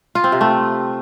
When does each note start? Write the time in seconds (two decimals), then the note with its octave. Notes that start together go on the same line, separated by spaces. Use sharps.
0.15 F4
0.24 C4
0.32 C3
0.41 A3